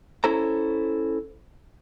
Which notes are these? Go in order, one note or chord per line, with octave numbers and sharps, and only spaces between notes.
C#4 E4 A4 C5 A#5